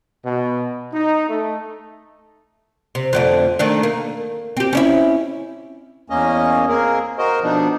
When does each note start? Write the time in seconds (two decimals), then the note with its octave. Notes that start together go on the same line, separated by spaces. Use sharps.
0.24 B2
0.93 D#4
1.29 A3
2.95 C3
3.13 F2 D3 A3
3.59 D#3 A3 D4
3.83 A#3
4.57 C4 G4
4.73 C#4 D4 E4
6.10 E2 A#3 C#4 D#5
6.69 A#3 C4 G#4 A#4
7.18 F#4 A#4 C5 D#5
7.43 B2 D3 F3 B3 D4 D#4